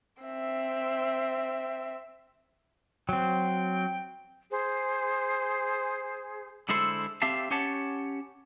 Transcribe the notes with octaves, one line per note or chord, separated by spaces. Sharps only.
C4 E5
F#3 C4 G5
G#4 C5
D3 G#3 E4 A4 C5
C4 G4 E5 F5 A5
C#4 G4 C#5 F#5 A5